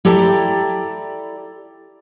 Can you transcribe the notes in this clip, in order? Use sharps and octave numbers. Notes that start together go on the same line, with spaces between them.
E4 G4 A4 D5 A#5